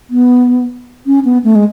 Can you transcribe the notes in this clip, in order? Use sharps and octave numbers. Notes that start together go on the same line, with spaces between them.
B3
C#4
B3
A3
G#3